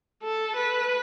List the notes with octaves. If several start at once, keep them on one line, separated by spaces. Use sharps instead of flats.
A4
B4